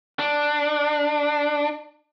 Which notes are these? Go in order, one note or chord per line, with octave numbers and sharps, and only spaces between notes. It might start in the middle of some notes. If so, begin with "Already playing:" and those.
D4